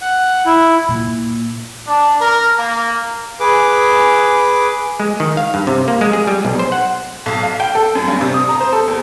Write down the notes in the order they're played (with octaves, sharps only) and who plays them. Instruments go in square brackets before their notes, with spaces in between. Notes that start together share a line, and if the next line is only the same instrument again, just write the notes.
[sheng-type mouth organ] F#5
E4
[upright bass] A#2
[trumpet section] D4
A#4
A#3
[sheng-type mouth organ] G#4 B4 D6
[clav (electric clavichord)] G#3
D#3
F5
G2
C3
A#3
G#3
G#4
G3
B1
C5
F#5
[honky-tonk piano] B1
F5
G5
A4
F#2
G2
C3
D#6
A#5
C5
A4
E2